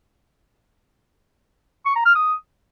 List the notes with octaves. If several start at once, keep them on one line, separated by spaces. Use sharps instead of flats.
C#6
A#5
F6
D#6